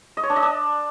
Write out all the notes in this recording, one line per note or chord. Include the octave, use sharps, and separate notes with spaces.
D#5
C#5
D4
D#5
D4